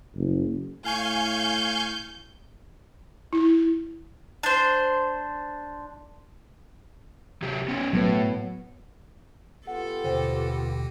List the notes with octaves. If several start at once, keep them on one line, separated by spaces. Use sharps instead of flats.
F#1
A2 F5 G#5 C#6 G6
E4
D4 C5
C3 F#3 G4
B3 C#4
A2 F#3 B3 B4
B3 F4 G4 A4 F#5
D#2 B2 D3 C5 G5
A4